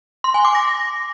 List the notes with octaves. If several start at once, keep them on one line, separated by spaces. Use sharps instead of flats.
C6
G#5
D6
A#6